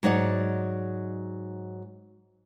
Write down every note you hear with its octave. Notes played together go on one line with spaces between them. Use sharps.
G#2 F#3 D#4 D5 F#5